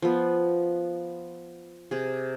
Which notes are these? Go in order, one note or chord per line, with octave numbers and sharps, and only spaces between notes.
F3 B3
C3 G#4